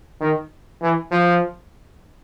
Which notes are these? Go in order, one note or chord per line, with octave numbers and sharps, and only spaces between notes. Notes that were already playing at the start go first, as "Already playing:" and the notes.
D#3
E3
F3